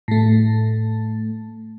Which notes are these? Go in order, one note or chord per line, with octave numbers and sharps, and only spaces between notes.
A2 A3